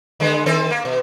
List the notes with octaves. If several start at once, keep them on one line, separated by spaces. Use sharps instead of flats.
D3 G#3 B3
D#3 C4 A4
A#3
B2